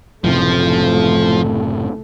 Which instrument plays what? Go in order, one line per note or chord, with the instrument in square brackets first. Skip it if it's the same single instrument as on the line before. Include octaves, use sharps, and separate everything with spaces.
[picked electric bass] F#1 A2 C3 [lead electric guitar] F3 [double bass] A3